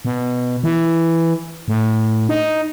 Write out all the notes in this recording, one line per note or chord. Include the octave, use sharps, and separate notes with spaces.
B2
E3
A2
D#4